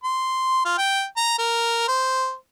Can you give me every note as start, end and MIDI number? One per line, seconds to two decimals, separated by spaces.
0.04 0.62 84
0.65 0.78 65
0.78 1.05 79
1.17 1.34 82
1.38 1.87 70
1.88 2.34 72